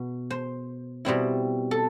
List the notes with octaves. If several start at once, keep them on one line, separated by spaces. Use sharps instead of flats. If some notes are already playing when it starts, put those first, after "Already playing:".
Already playing: B2 B3
C5
B2 G3 C4 E4
A4